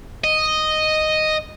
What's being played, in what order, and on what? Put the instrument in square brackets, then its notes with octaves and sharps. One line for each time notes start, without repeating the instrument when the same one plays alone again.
[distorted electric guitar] D#5